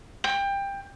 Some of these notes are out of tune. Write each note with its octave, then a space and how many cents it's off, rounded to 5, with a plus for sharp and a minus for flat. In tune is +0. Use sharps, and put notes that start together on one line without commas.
G5 +20